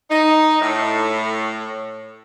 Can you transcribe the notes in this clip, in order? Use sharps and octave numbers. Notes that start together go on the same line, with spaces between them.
D#4
A2